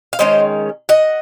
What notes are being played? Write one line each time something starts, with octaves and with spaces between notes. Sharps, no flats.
F5
D#3 G#3 C#4 C5 D#5
D#5 F#5